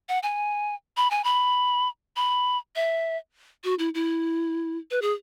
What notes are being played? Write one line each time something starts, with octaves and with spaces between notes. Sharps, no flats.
F#5
G#5
B5
G#5
B5
B5
E5
F#4
E4
E4
B4
G#4